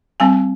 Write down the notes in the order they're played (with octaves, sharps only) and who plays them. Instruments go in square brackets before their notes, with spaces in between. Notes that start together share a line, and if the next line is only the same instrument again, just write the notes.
[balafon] G3 C4 G#5